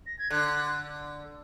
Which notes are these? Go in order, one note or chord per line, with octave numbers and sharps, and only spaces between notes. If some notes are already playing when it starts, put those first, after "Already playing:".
A#6
G#6
D3 F#6